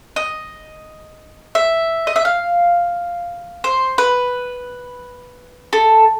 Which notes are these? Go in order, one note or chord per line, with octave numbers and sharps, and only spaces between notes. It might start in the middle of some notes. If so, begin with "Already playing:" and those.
D#5
E5
D#5
E5
F5
C5
B4
A4